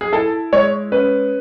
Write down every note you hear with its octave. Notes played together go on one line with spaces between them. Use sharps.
G#4
E4 A4
G#3 C#5
C#4 B4